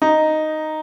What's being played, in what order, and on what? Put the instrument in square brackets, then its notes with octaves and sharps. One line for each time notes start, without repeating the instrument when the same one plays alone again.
[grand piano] D#4